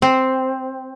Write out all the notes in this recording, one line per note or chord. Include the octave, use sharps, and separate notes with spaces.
C4